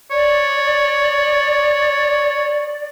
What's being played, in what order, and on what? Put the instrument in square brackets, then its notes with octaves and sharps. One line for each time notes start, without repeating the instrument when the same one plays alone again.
[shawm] C#5 [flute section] D5